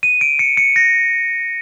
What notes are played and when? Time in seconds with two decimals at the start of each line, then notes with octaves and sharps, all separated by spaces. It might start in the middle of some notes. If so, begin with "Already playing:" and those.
0.03 D#7
0.21 D7
0.39 C#7
0.57 C#7
0.76 A#6